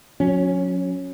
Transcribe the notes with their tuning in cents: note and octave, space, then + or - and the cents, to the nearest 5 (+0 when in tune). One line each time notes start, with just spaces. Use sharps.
F#3 -35 C#4 -5